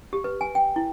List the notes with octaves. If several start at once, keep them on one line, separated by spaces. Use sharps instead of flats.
G4
B4
G#5
G5
E4